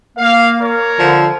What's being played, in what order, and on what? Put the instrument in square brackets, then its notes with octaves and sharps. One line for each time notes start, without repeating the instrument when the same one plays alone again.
[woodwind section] A#3 [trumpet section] F5
[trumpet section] A#4 C#5
[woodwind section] D3 [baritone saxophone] F3